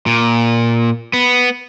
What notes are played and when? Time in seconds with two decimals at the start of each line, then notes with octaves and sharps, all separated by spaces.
0.06 A#2
1.13 B3